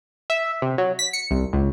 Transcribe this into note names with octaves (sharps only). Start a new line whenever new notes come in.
E5
C3
F#3
B6
C#7
C2
C#2